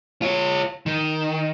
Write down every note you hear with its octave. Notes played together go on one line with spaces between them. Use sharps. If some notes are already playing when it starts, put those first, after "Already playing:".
F4 C#5
D#3